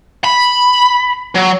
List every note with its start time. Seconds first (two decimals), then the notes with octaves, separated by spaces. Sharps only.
0.24 B5
1.35 F#3